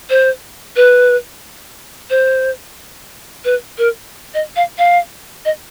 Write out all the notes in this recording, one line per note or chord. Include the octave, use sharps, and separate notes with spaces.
C5
B4
C5
B4
A#4
D#5
F5
F5
D#5